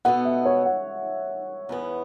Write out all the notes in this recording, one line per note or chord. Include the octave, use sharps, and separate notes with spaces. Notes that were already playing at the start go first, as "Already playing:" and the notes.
B2 B3 A4 F#5
E5
C#5
F#5
E2 E3 B3